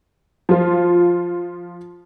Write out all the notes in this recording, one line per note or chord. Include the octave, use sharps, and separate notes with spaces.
F3 F4